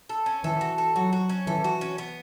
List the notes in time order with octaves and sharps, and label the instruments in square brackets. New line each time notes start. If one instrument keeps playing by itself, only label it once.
[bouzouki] A4
C#4
[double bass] E3 [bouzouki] A4
[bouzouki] F#4
A4
[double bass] F#3 [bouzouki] F#4
[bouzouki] F#4
C#4
[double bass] E3 [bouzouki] A4
[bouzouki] F#4
C#4
B3